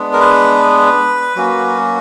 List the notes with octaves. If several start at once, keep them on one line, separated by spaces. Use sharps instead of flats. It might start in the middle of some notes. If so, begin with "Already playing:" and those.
Already playing: G#3 B3 D4
A#4
B4
F#3 A#3 C#4 F#4